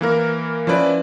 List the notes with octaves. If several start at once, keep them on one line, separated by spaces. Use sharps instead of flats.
E3 A#3 A#4
F3 C#4 E4 B4 D5